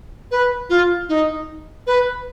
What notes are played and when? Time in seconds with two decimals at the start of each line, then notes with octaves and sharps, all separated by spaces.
0.31 B4
0.69 F4
1.08 D#4
1.86 B4